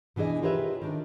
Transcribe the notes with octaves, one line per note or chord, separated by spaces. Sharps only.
B2 E3 D4 G#4 D#5
F4 G4 A#4 B4 C#5 E5
D#3 D4